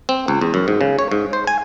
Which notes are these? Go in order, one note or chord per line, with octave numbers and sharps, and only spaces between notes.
C4
C#2
E2
F#2
G#2
C#3
C#5
G#2
C5
G#5